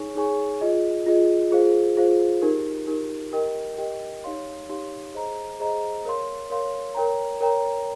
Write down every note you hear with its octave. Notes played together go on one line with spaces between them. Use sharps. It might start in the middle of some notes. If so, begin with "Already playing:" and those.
Already playing: D#4 G#4 C#5 G#5 C#6
D#4 G#4 C#5 G#5 C#6
F4 G#4 D#5
F4 G#4 D#5
F4 G#4 C5 F5
F4 G#4 C5 F5
D#4 G4 A#4
D#4 G4 A#4
G4 A#4 D#5 G5
G4 A#4 D#5 G5
D#4 G4 C#5 F5 C6
D#4 G4 C#5 F5 C6
G#4 C5 D#5 A#5
G#4 C5 D#5 A#5
A#4 C#5 F5 C6
A#4 C#5 F5 C6
A#4 C#5 G5 A#5
A#4 C#5 G5 A#5